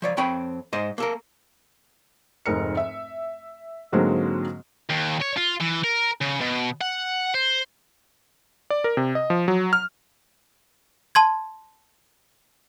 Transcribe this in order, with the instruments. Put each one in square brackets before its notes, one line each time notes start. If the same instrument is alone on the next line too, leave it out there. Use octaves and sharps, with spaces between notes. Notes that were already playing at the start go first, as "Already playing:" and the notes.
[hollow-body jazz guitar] F3 C#5 D5
F2 C4 C#5 G5 B5
G#2 C5 D#5
A#3 A4 A#4
[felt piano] F1 G#2 A#4 C#7
E5
G#2 D3 F#3 G#3 A#3 C4
[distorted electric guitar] D#2
C#5
F4
E3
A#4
C#3
B2
F#5
C5
[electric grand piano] D5
A#4
C3
D#5
F3
F#3
F6
[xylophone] A5 C6 G#6